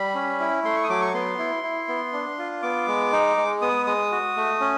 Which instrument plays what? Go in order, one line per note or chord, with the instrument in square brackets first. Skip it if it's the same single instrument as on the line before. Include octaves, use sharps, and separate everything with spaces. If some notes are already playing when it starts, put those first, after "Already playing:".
Already playing: [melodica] G3 B5
C#4
E4
A3 C6
C#6
D#6
F#3 D6
C#6
B3 C6
E4
E4
B3
D4
F4
B3 D6
G#3
D#4
G#3
B3 D#6
G#3 D#6
F#4
A3
C#4